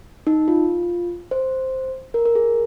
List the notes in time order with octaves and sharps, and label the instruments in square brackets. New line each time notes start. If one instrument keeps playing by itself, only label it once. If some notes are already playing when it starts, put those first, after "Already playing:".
[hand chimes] D#4
F4
C5
A#4
A#4
G#4